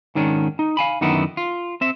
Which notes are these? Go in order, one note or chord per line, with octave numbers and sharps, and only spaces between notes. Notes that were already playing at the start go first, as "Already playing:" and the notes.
G#2 D#3 C#4 D4
D#4
F5 G#5 B5
F#2 D3 D#3 B3 D#4 E4
F4
C4 E5